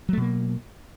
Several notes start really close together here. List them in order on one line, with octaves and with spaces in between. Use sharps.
F#3 A3 B2 A#3